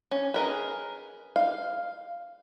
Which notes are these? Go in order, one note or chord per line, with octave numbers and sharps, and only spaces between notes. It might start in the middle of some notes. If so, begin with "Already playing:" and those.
C#4
G#4 A#4 B4
F5